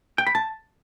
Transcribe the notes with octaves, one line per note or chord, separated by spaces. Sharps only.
G5
B5
A5